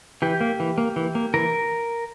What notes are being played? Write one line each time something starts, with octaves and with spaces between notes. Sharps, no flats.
E3 G4
A#3
E3
A#3
E3
A#3
E3 A#4